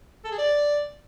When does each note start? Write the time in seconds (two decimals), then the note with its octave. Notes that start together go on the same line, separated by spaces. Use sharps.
0.25 A4
0.32 G#4
0.39 D5